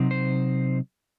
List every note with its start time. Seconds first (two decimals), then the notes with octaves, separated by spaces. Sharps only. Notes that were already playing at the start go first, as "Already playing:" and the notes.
Already playing: C3 F#3 C4 D#4
0.11 C5